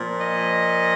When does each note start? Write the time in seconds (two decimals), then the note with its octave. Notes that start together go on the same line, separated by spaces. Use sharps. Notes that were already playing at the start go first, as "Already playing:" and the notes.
Already playing: A#2 F3
0.21 D#5